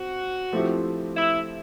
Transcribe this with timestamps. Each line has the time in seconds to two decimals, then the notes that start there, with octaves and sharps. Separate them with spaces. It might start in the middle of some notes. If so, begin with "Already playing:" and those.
Already playing: C4 F#4
0.52 F3 A3 C4 E4 G4
1.17 E4